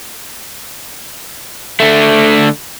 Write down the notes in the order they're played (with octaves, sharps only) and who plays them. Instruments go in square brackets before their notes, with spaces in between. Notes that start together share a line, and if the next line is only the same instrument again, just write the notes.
[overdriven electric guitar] D3 A3